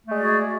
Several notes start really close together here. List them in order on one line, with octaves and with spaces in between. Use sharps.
A3 G#3 D5 F#4 G#4